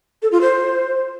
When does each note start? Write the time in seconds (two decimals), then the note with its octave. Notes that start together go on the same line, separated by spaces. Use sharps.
0.22 A4
0.32 F4
0.41 C5